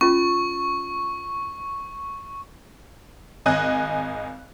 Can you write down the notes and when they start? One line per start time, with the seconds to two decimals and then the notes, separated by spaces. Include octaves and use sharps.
0.01 C#4 F4 C#6
3.46 G#1 D#5 G#5 F#6